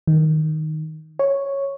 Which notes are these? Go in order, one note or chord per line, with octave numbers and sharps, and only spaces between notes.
D#3
C#5